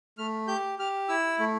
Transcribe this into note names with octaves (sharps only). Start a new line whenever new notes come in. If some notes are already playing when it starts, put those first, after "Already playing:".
A3 F6
G4 G6
G4 F6
E4 E6
A3